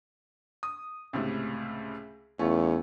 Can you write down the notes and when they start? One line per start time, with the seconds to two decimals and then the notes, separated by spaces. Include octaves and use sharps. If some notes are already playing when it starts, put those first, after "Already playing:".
0.63 D#6
1.13 C#2 A2 C3
2.39 E2 A3 C#4 F4